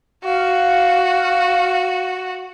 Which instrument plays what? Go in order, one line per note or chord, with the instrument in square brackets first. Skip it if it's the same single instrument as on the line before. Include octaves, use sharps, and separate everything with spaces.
[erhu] F#4 [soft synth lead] F5